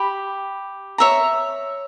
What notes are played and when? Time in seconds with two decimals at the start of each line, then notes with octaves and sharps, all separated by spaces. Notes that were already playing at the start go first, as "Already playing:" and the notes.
Already playing: G4 B5
0.98 C#5 E5 A#5